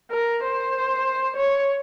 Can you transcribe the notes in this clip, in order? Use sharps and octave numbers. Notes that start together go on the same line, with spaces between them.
A#4
C5
C#5